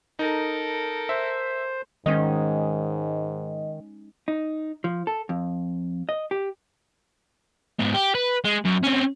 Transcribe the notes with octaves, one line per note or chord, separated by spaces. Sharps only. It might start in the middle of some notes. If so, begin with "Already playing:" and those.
D#4 A4 A#4
C5 E5
G#2 D#3 G#3 C#4 D#4 D#5
D#4
F3
A4
F2
D#5
G4
G#2 B3
G4
B4
G#3
F#2
C4 C#4